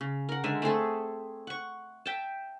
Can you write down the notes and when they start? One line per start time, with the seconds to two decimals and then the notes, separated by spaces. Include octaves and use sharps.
0.01 C#3
0.29 A#4 F#5
0.44 D3 G#3 E5
0.62 A3 C4 G#4 A4
1.47 F#5 C#6
2.06 E5 G5 A5